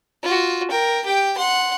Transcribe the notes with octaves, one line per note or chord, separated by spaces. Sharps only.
F4 F#4
A#4 G5
G4 G5
F#5 C6